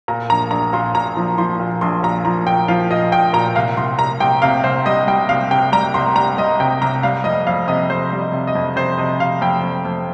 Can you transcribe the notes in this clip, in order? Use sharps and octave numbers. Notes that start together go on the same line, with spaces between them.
A#2 A#5
A#1 A#5
A#1 A#5
A#2 C6
A#2 A#5
F3
F3 C6
A#2
A#1 C6
A#2 A#5
F3 A#5
A#2 G5
F3 F5
A#2 D#5
A#2 G5
A#2 A#5
C2 F5
C2 C6
C2 A#5
C2 G5
C3 F5
C2 C5
G3 D#5
G3 G5
C2 F5
C3 G5
G3 A#5
C2 C6
G3 A#5
G3 D#5
C3 G5
C2 A#5
G3 F5
F2 D#5
F2 F5
C3 D#5
F2 C5
G3
D#5
C3
D#5
F2
C3 C5
C3 D#5
C3 F5
F2 G5
F2
F2